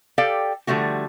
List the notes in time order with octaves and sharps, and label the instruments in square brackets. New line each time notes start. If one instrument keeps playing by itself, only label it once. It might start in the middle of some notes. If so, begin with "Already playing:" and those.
[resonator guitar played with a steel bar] G4 A4 D5 F5 G5
D3 F3 G3 A3 F#4